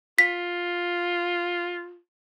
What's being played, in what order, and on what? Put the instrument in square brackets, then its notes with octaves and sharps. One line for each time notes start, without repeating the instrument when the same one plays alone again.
[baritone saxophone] F4 [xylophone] B6